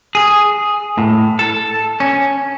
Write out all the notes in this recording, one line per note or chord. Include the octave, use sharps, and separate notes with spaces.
G#4
A2
A4
C#4